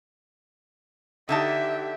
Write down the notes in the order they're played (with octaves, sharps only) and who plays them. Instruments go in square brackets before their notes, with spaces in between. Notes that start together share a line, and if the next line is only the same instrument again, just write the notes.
[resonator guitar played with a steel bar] D3 D#4 A5 [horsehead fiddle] G4 E5